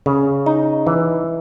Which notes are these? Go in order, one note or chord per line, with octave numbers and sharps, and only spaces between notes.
C#3
D#4
E3